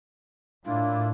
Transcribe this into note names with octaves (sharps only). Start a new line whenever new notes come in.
A2 A#3 D4 E4 F4